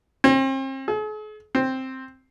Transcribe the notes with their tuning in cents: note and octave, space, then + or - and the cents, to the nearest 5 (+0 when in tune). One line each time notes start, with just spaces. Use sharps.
C4 +40
G#4 +45
C4 +5